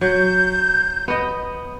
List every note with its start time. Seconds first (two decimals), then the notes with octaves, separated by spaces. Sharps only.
0.01 F#3 G6
1.08 B3 D#5